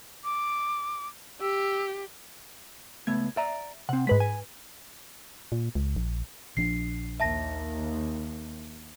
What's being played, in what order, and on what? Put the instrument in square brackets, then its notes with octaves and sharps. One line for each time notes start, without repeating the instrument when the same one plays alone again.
[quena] D6
[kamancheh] G4 [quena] E6
[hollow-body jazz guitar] C#2 A3 B3 [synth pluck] G#6
[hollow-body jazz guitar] D5 A#5 [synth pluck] E5
[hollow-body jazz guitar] C3 C4 [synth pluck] F#5
[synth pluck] G#2 B4 B6 [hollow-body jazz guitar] G#3
[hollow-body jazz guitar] G#5
[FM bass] A#2
C#2
A#1
[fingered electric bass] A#1 F3 D4 [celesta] C7
[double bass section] D#2 [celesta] E5 A5 A#6